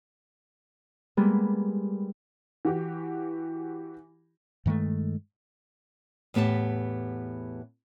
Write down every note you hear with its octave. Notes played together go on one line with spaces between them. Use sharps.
G3 G#3 A#3 B3
E3 F#4 G4
G2 D#3 G#3 A3
E2 A2 B3 G4 A5